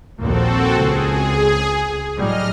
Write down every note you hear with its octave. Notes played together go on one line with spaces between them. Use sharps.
A#1 D#2 A#3 C4 F#4 A4
C#2 G#4
A2 F#3 G3 D#5 F6